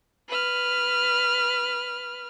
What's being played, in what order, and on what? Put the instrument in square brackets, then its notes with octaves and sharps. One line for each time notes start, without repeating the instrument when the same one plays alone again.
[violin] B4 F6